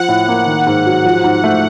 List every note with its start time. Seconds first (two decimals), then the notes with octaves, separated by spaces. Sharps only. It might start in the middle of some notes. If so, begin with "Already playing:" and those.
Already playing: F3 F#5
0.08 A2
0.28 A#3
0.46 D#3
0.67 G#2
0.86 F#3
1.05 F3
1.24 G#2
1.44 A3